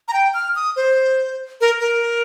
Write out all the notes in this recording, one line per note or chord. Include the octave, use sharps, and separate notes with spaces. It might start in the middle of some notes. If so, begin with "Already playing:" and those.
A#5
G5
F6
D#6
C5
A#4
A#4